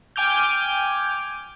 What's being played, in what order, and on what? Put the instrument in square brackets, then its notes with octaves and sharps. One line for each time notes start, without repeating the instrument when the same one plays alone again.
[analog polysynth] G5 G#5 D6 F6 G6